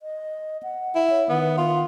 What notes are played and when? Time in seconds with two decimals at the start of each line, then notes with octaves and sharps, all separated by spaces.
0.02 D#5
0.63 F#5
0.95 E4
1.10 C#5
1.29 D#3 B3
1.58 F4